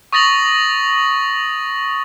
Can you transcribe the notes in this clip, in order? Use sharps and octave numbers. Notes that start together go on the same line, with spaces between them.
C#6 D#6 A6 A#6 F7 F#7